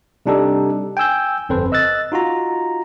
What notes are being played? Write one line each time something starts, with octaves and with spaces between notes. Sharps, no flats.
C3 G3 D4 D#4 G4 A4
G5 G#5 E6 G6
G1 F2 C4 A4 B4 C5
D#5 E6 F#6 A6
D#4 F4 F#4 A#5